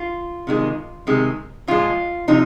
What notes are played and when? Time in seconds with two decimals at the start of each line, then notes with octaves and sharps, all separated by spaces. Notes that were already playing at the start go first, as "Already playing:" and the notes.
Already playing: F4
0.47 C3 D#3 G#3
1.07 C3 D#3 G#3
1.68 A#2 F3 G#3 F4
2.28 C3 F3 D#4